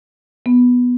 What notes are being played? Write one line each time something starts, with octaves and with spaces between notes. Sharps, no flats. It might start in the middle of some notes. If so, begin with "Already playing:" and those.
B3